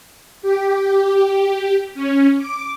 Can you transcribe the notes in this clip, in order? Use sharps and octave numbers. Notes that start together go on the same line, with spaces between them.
G4
C#4
D6